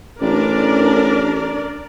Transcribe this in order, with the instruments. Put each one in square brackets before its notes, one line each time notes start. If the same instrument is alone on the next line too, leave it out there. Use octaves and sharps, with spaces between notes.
[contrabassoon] A1 [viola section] D4 A#4 D5